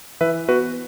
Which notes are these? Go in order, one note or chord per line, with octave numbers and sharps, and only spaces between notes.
E3 B4 E5
B3 F#4 B4